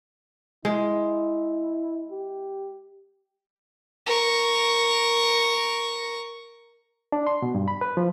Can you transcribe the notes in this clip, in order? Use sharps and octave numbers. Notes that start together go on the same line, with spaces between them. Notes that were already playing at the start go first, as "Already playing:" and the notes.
G#3 E4
G4
A#4 C#6
D4
C6
B2
G2
B5
B4
F3